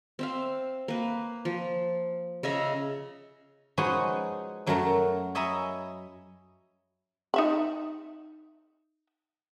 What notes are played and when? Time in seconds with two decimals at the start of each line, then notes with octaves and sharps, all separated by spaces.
0.19 C4 E5 F5
0.88 A#3 B4
1.45 F3
2.43 C#3 D#5 E5 A#5
3.77 F3 G#3 D#4 F#4 B4 C#5
4.66 F#2 F#3 A3 A#4 A5 A#5
5.35 C#5 D#5 E5 G#5 A#5 B5
7.34 D#4 E5 B5